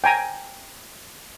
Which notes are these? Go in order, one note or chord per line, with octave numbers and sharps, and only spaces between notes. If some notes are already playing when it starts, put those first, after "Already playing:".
G5 G#5 A#5